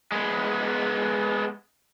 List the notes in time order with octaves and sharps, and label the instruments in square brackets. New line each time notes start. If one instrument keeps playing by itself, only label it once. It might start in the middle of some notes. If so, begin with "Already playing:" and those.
[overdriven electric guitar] G#3 B3